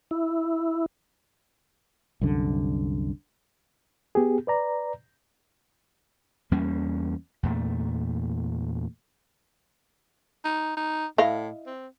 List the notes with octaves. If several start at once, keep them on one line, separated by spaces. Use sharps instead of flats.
E4
C2 F#2 D3
B3 G4 G#4
B4 D5 A#5
E2 G3 A#3 C#4
E2 A#2 A3
D#4
D#4
A2 E4 D#5 F5
C4